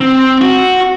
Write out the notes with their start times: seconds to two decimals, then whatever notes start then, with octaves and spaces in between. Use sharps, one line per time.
0.01 C4
0.41 F#4